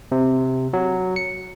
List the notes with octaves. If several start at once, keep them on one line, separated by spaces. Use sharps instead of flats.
C3
F#3
C#7